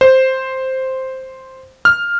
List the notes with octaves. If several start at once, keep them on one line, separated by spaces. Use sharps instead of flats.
C5
F6